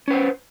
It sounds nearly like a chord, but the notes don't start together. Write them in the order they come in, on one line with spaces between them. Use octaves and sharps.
C#4 B4 C5